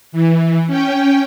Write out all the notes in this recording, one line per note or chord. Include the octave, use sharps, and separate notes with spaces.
E3
C#4 G5